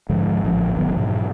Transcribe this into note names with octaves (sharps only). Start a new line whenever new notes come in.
G#2 D3 F3 G#3
A1 F3 C#4
F1 D#3 F#3 B3
G#2 B2 E3 F#3